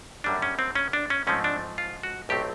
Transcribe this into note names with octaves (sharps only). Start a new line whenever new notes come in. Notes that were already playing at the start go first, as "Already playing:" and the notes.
F#2 D3 G3 A#3 D4
C#4
C4
C#4
D4
C#4
G#2 F3 A3 C4 C#4
D4
F4
F#4
B1 A2 F#3 A3 C4 G4